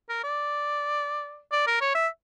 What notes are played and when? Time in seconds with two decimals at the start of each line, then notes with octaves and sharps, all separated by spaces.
0.09 A#4
0.24 D5
1.52 D5
1.67 A#4
1.81 C#5
1.95 E5